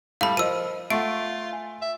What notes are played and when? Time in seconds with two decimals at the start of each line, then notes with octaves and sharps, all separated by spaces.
0.21 A2 G3 F5 B5
0.37 F3 A#4 D#5 E6 D#7
0.90 A3 F4 F#5 C#6 C7 D7
1.53 G#5
1.81 E5